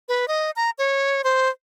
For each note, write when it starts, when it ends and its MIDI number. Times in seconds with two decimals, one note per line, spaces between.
0.09 0.28 71
0.28 0.51 75
0.56 0.70 82
0.78 1.22 73
1.24 1.49 72